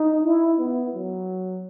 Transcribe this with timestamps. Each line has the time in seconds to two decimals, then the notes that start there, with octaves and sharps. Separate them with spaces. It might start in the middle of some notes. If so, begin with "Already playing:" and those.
Already playing: D#4
0.24 E4
0.58 B3
0.93 F#3